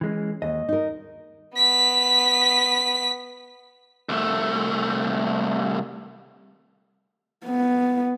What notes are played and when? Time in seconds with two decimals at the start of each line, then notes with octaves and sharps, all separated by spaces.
0.01 E3 G#3 C#4
0.42 D#2 D#5
0.69 D#4 A#4
1.55 B3 B6
4.09 C2 A3
7.45 B3